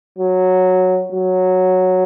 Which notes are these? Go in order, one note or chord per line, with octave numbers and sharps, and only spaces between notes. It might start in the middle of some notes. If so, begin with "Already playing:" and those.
F#3
F#3